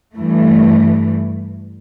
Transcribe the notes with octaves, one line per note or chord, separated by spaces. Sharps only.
G2 E3 A3